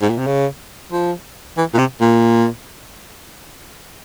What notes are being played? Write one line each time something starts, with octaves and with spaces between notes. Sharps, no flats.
G#2
A#2
C3
C#3
F3
E3
A#2
C3
A#2